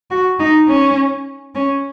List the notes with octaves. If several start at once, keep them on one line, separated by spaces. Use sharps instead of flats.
F#4
D#4
C#4
C#4